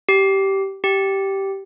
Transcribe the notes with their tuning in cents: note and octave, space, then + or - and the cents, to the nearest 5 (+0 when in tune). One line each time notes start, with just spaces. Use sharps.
G4 -15
G4 -10